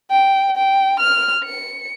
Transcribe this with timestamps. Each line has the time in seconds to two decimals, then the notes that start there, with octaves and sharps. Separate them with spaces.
0.10 G5
0.57 G5
1.00 F6
1.44 C#7